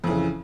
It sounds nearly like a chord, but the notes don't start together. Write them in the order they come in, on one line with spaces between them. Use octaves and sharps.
F2 E3 C#3